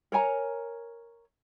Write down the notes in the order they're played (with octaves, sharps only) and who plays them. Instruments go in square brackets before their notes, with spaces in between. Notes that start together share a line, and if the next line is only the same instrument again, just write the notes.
[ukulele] A#4 C#5 G#5 A#5